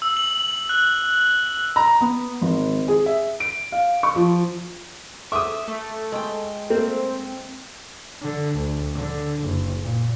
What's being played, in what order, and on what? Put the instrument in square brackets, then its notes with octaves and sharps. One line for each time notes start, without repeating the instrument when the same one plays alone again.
[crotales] E6
F#7
F#6
[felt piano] A#5
B3
G#1
G#4
E5
D7
F5
C#6
F3
[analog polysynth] E5 [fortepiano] D6 D#6
[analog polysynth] A3
[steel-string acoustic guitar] G#3 G5
[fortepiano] A3 A#3 [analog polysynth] C4
[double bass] D3
D2
D3
F#1
A#2